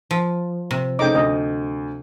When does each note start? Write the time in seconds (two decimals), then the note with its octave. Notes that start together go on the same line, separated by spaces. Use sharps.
0.11 F3
0.71 C3
0.99 C#3 A3 D#4 G5 D6
1.15 D2 D#5